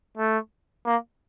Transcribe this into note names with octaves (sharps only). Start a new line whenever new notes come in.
A3
A#3